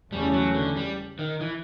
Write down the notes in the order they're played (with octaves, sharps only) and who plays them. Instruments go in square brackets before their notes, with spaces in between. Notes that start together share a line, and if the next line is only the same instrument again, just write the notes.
[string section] E2 C#3 E3 A3 C#4 [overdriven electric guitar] G3
[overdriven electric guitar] F#3
D3
G3
D#3
E3